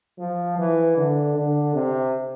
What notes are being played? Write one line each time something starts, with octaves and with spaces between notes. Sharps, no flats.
F3
E3
D3
D3
C3